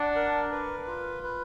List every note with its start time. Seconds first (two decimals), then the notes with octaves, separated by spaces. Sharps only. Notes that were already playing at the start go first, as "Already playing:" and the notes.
Already playing: D4 F#5
0.15 A#4
0.51 B4
0.87 F4
1.23 B4